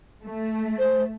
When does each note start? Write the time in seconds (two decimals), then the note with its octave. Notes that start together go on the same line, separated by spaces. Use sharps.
0.25 A3
0.79 C5